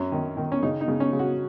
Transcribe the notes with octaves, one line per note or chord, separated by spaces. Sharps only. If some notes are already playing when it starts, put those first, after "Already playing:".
Already playing: F#2 C#4
D#3
D#3
C#4
C#3 D#4
D#4
C#3
C#4
C#3
F#4